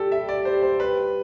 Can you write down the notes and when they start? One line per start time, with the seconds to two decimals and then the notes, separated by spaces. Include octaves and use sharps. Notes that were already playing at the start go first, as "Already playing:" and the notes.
Already playing: G2 G4 A4
0.12 G3 E5
0.29 D5
0.45 G3 C5
0.63 C5
0.80 C3 B4